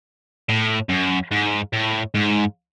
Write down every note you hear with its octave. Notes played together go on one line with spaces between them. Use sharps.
A2
F#2
G#2
A2
G#2